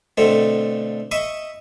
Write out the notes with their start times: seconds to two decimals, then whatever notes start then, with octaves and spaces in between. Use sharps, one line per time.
0.17 B2 D3 A3 C4
1.11 D#5 E5 B5 C#6 D#6